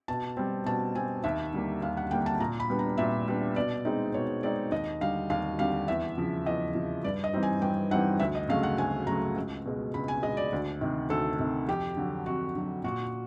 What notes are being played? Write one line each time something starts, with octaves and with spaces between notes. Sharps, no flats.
B2 A5
G3 C4
B2 A5
G3 C4 G#5
D#2 E5
D3 G3 A#3
D#2 F5
F#5
D3 G3 A#3 G5
A5
A#2 A#5
B5
G3 B3 D4
A#5
A#2 E5
G3 B3 D4
B2 D5
G#3 C4 D#4
B2 C#5
G#3 C4 D#4 D5
D#2 D#5
D3 G3 F5
D#2 F5
D3 G3 F5
E2 E5
C#3 F3
E2 D#5
C#3 F3
G2 D5
D#5
E3 G3 C4 D#4
G#5
G2 G5
E3 G3 C4 D#4 F#5
D2 E5
D#5
C#3 F#3 A3 F5
F#5
D2 G#5
C#3 F#3 A3 A#5
C#2
B2 G#3
C#2 B5
G#5
B2 G#3 D#5
D5
D2
C3 D#3
D2 A4
C3 D#3
F2 G4
D3 F#3
F2 F#4
D3 F#3
A#2 F#4